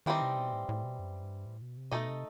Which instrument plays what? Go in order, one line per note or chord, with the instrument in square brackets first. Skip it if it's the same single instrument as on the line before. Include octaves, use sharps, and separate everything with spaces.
[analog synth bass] D#3 [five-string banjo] E3 G3 C4 D#4
[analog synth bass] C3
B2
A2
A2
B2
F#2
G2
A2
B2
C3
[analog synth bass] B2 [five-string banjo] A3 D#4 A4 D#5
[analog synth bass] C3